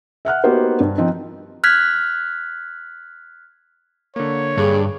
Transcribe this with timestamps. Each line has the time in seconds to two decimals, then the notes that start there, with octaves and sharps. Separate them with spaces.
0.25 E5 F#5 F6 F#6
0.44 A#3 B3 D#4 F#4 G4 C5
0.80 G2
0.98 F3 C4 D#4
1.64 F6 F#6 G#6 B6
4.16 D3 A#3 C#5
4.57 G2 G#4